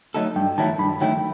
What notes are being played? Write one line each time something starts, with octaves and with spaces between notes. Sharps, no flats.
F#3 A3 D#4 A4
G2 G5
D#3 F#3 A3 E4 A5
G2 B5
D#3 F#3 A3 E4 G5